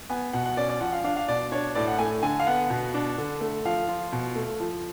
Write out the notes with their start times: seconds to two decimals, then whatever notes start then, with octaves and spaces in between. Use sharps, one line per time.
0.10 B3 G#5
0.33 B2 F#5
0.46 F#5
0.57 C#4 D5
0.69 D5
0.80 F3 F#5
0.92 F5
1.04 D4 F5
1.17 F5
1.28 B2 D5
1.52 D4 C#5
1.75 A2 D5
1.88 F#5
1.99 A3 G#5
2.23 D3 G#5
2.40 F5
2.47 B3 F#5
2.70 B2
2.94 D4
3.18 D3
3.41 A3
3.65 F3 F5
3.88 F4
4.12 B2
4.36 A3
4.60 F3